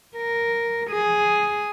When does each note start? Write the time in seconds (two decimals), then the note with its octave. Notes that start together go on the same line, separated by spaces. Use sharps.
0.16 A#4
0.91 G#4